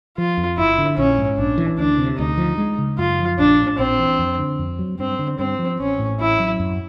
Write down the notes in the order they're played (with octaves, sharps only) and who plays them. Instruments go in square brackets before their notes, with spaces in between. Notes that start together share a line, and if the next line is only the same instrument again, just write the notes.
[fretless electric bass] F3 [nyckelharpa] F4
[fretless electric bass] F2
[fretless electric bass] G1 [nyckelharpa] E4
[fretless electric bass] D3
[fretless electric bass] A#1 [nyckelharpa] C#4
[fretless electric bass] G#2
[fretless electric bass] A#1 [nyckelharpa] D4
[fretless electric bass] E3
[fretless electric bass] D2 [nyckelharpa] D4
[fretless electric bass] C3
[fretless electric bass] D2 [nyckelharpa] D#4
[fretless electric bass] F3
G#3
C#3
[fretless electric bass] F#2 [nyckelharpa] F4
[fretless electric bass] F3
[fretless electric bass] A#1 [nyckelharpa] D4
[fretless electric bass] A2
[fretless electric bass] A#1 [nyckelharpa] C4
[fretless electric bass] E3
F2
D3
F2
F#3
[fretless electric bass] G2 [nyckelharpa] C4
[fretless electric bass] D3
[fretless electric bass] G2 [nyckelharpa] C4
[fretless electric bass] F3
[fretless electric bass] A1 [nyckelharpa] C#4
[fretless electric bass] A2
[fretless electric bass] A1 [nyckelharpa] E4
[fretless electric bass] F#3
F#2